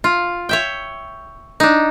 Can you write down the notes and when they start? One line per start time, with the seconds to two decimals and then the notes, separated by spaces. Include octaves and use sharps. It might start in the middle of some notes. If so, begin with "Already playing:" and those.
0.04 F4
0.49 C#5 E5 G5
1.60 D4 D#4